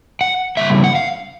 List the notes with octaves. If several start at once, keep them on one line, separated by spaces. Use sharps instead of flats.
F#5
C#3 E3 G3 A#3 E5
F#5
F5